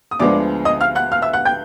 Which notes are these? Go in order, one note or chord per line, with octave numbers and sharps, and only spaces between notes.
D#6
D2 D3 F3 G#3 B3 D5 D6
D#5 D#6
F5 F6
F#5 F#6
F5 F6
E5 E6
F#5 F#6
G5 G6